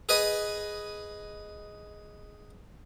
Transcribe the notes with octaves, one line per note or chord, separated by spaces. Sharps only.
G#4 B4 D#5 G#5